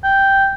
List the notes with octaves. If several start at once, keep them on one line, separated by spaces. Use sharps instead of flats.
G5